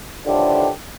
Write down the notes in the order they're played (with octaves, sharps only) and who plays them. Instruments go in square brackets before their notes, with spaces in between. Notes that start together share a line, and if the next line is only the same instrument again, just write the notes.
[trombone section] A2 D3 D#3 F3 D4 G4